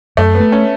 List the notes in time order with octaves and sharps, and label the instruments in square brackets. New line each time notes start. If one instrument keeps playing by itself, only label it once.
[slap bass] F#2 [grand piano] A3
[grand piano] B3
[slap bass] A3
[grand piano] C#4